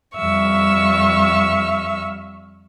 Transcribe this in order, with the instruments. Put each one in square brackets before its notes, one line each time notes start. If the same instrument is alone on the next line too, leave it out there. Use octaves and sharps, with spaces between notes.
[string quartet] F2 G3 E5 F5 C#6 E6